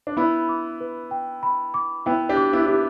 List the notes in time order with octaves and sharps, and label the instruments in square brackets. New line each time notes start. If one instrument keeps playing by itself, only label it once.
[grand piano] D4
[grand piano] B3 E4 [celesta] B5
[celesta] D6
B4
G5
B5
D6
[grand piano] B3 E4 [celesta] G5
[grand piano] D4 G4
[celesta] D6
[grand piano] B3 E4
[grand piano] E4 [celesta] G4